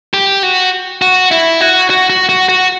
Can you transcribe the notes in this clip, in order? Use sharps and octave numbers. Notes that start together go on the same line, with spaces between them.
G4
F#4
F#4
E4
F#4
F#4
F#4
F#4
F#4